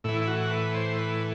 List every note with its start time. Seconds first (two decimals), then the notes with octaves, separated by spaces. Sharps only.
0.04 A2 E3 E4
0.21 E4
0.27 F#4
0.51 B4
0.74 C5
0.98 B4